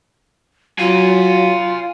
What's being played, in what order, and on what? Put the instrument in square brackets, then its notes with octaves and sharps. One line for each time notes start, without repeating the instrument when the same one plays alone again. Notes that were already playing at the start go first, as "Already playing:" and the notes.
[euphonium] F#3 [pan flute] F4 [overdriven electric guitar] F5 G#5